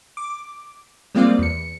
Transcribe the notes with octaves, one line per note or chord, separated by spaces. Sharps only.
D6
G3 G#3 A#3 C4 F4 D5
E2 C#7